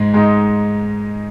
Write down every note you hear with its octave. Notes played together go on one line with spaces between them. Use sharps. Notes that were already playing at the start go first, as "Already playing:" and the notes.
Already playing: G#2 G#3
G#2 G#3 D#4